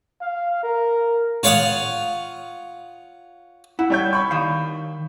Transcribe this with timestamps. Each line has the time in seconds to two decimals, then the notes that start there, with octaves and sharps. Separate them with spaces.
0.21 F5
0.63 A#4
1.43 F4 C#5 F5 F#5 D#6
3.79 E4 F#5
3.90 G3 C#5 G6
4.13 B5 C#6
4.31 D#3 F5